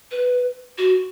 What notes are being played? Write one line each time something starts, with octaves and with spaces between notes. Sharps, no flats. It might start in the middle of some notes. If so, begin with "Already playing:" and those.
B4
F#4